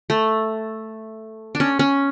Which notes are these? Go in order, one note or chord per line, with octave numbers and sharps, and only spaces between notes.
A3
D4
C#4
C#4